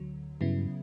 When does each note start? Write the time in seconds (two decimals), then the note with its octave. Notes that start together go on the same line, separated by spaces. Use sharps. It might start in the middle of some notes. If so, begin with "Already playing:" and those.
Already playing: D2 D3 F#3
0.41 G2 C#3 F#3 B3 E4